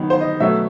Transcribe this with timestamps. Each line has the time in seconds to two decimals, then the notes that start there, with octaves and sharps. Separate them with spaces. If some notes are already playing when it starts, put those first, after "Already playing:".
Already playing: D#3 F#3 B3
0.10 C5
0.21 D#5
0.40 B2 F#3 A3 E5